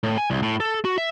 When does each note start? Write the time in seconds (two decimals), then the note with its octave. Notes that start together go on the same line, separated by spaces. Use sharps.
0.03 A2
0.18 G#5
0.30 C2
0.43 A2
0.60 A4
0.85 F#4
0.98 E5